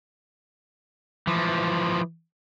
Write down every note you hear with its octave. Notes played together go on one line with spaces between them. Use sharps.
E3 F3